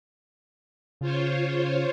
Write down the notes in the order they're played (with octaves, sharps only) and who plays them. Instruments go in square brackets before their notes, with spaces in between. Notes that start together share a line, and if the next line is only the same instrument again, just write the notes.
[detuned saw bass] C#3 [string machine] F4 C5 C#5